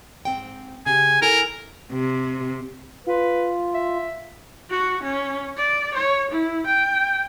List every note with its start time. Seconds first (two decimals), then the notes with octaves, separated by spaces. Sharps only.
0.25 G#2 C4 G5
0.86 C#3 G4 G#5
1.22 E4 A4 A#4 G#5
1.92 C3
3.07 F4 B4
3.74 E5
4.71 F#4
5.03 C#4
5.57 D5
5.95 C#5
6.31 E4
6.67 G5